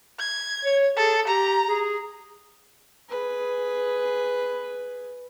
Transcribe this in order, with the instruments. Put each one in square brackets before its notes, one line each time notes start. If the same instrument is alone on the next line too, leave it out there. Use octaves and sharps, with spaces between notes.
[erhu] G#6
[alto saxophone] C#5
[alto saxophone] G#4 [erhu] A4
[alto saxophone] G4 [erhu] A#5
[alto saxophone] G#4
[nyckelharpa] G#4 B4